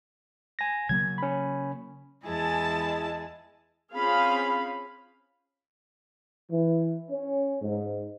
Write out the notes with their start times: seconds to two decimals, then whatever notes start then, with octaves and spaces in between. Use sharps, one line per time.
0.59 G#5 A#6
0.89 C#3 F#3 A#3 G#6
1.18 C#4 B5
2.25 E2 G#3 E4 G#4 A5
3.95 C4 C#4 F4 G#4 F5 B5
6.51 E3
7.10 C#4
7.61 G#2